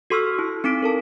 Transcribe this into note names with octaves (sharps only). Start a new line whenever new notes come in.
F#4 A4 C6 C#6 E6 F6
E4
C4 D#4 D6 B6 D7
A4 A#4 A5